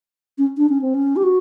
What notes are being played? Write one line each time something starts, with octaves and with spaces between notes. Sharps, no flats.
C#4
D4
C#4
C4
C#4
G4
F#4